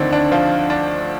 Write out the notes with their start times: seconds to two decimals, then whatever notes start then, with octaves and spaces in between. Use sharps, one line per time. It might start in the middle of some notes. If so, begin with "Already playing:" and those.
Already playing: D2 D3 D#3 F3 C4 D4
0.13 D4
0.32 F3 F4
0.70 D4